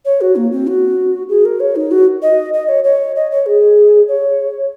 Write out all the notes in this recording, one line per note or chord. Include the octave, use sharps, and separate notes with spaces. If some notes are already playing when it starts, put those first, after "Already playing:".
C#5
F#4
A#3
C4
F#4
G#4
A#4
C#5
D#4
F#4
D#5
D#5
C#5
C#5
D#5
C#5
G#4
C#5